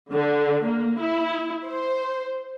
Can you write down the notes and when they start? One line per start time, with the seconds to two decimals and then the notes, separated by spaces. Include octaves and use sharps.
0.11 D3
0.65 A#3
0.99 E4
1.66 C5